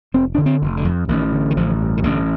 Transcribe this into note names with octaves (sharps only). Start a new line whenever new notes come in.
F1 C4
D3 D4
C4
F1
D3
F2
A1 D#3
D3
D#3
A1 F3
G2
D#3
A1 D3